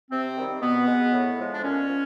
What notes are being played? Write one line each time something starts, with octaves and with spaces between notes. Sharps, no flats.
C3 C4
D#3 G3
B2 B3
G#3
A2
F3 G#3
D4
A#2 C#4
F3